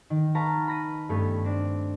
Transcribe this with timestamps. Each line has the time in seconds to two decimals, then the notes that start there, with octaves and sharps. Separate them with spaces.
0.10 D#3
0.35 B4 F5 A5 A#5 C#6
0.68 B5 A#6 D#7
1.09 G2 A3 B3 C#4
1.44 C4 D4